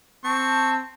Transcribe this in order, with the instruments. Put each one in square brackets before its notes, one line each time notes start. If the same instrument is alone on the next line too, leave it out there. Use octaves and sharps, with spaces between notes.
[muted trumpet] C4 [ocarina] A5 [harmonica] C#6